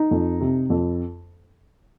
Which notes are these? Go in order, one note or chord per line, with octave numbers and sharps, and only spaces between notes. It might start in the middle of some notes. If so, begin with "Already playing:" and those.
Already playing: D#4
F2
C3
F2